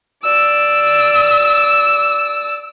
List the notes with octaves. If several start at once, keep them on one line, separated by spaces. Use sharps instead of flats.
D5 E6